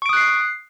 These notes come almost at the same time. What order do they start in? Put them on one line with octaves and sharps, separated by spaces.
C#6 D7 D#6 F#6 C7